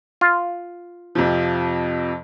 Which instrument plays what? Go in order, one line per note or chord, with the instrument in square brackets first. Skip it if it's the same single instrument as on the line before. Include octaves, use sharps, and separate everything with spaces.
[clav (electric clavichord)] F4
[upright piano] F2 C3 F3